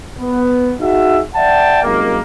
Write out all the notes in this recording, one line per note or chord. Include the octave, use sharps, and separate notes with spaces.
B3
D#4 F#4 G#4 E5
D5 E5 F#5 G5 A5
C2 F#2 G#3 A#3